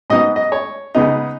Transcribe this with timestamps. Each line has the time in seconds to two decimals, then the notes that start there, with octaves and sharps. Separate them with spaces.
0.10 G#2 F#3 B3 D#4 D#5
0.36 D#5
0.52 C#5
0.95 C#3 G#3 B3 D#4